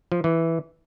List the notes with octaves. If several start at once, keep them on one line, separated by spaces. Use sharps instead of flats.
F3
E3